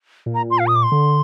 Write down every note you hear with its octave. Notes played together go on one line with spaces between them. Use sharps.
A#2
A#5
C6
F5
D#6
D6
C6
D3